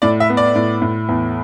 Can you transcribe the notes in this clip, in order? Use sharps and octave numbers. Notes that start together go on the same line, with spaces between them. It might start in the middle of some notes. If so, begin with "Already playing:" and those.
A2 D5
E5
B3
D5
A2
A2
E2